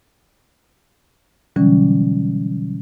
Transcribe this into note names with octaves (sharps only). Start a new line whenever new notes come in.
B2 D3 E3 F#3 G3 C#4